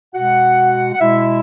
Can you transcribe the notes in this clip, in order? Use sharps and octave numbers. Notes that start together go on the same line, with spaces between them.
B2 G#3 F#4 F#5
F#5
B2 G#3 E4 E5